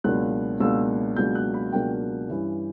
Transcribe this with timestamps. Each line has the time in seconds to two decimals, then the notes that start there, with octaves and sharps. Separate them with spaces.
0.04 C#2 B2 F#3 A#3 D4 F#6
0.60 C#2 B2 F#3 A#3 D4 E6
1.16 C#2 B2 F#3 A#3 D4 G6
1.35 F#6
1.54 B5
1.72 C#2 B2 F#3 A#3 D4 G5
2.28 G2 E3 G3 C#4